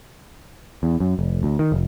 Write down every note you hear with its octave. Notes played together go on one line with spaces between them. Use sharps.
E2
F#2
F1
D2
D#3
F1